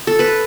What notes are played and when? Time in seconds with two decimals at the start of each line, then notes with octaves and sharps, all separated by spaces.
0.07 A4
0.19 B4